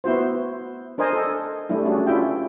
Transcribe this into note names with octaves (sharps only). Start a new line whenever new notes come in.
B3 E4 F#4 C5
D4 A#4 C5 D#5 G#5
A4
G3 A3 D4 E4
C#4 D4 F#4 G#4
C#4 E4 F4 E5 G5